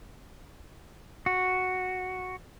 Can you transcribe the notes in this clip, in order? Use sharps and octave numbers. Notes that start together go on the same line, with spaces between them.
F#4